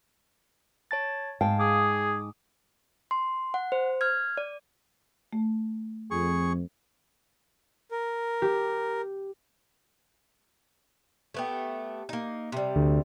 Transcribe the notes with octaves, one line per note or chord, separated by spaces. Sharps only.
C#5 A5 A6
G#2 F5 G5 A5
G#4 D6 D#6
C6
F#5
C5
F6 G#6
D5
A3
F2 G#4 C#6
A#4
G4
A3 B3 G4
A#3 D#4
C3 G3
D2